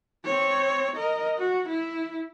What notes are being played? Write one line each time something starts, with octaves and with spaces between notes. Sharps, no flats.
C4 C#5
A#4 D#5
F#4
E4